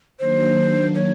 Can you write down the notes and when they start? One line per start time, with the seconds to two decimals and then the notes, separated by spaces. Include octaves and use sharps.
0.19 D#3 F#3 A#3 D4 C5
0.95 C#5